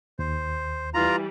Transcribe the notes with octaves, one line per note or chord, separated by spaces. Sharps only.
D#2 C5
E3 G3 F4 A#5